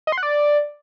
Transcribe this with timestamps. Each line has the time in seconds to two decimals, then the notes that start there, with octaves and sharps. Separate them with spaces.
0.07 D#5
0.12 C6
0.18 F#5
0.23 D5